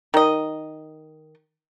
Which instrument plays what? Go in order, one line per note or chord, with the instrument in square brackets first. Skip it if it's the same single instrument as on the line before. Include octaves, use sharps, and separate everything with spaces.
[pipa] D#3 D#5